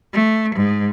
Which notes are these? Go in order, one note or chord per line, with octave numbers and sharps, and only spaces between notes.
A3
G#2